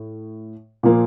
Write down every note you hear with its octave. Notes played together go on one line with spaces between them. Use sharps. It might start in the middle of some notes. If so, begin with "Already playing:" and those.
Already playing: A2
A#2 F3 A#3